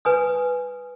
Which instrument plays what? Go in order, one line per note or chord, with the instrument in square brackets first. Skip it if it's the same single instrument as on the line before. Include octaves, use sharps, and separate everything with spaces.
[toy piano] B4 G#5 D#6